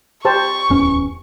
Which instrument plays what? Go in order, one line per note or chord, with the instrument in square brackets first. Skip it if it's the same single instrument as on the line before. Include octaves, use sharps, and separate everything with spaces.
[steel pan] G4 C5 A5 [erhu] C#6
[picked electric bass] D1 E2 C#4